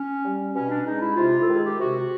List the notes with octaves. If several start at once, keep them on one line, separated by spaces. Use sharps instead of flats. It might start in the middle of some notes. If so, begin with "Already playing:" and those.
Already playing: C#4
G3
B2 C#4
D4
G#3 D#4
E4
C3 F4
A4
D#3 G#3 G#4
G4
C3 F#4